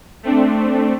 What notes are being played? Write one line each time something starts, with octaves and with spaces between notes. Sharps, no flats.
A3 C4 D4